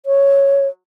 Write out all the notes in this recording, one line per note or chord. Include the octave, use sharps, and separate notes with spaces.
C#5